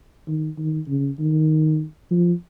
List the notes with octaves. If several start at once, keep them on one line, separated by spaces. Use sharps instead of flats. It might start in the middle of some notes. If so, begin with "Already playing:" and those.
D#3
D#3
C#3
D#3
F3